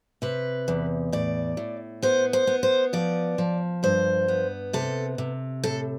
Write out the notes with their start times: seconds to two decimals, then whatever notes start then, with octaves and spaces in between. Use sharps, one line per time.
0.22 C3 B4
0.68 E2
1.12 A2 D5
1.57 A2
2.02 B3 C5
2.33 C5
2.47 B3
2.63 C5
2.93 F3 D5
3.38 F3
3.83 G2 C5
4.28 B3
4.73 C3 A4
5.18 C3
5.64 A2 A4